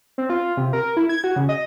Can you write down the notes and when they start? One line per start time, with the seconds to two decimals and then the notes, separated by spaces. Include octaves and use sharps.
0.18 C4
0.30 F4
0.57 C3
0.73 A#4
0.97 E4
1.09 G#6
1.24 F#4
1.36 C#3
1.49 D#5